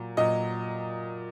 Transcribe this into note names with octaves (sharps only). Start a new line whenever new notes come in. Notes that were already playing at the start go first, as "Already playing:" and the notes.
Already playing: A#2 F#3
A#2 F#3 D#5